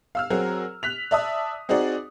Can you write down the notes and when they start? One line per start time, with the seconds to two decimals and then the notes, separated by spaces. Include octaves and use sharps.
0.15 F5 E6 F6
0.30 F#3 C4 F#4 G#4 A#4
0.83 F#6 B6 F7
1.11 D5 E5 A5 D#6
1.69 C4 D#4 F#4 G#4 D5